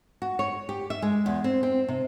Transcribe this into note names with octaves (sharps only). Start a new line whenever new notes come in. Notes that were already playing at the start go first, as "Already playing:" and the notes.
F#4
C#5
G4
E5
G#3
E2
C4
C4
C3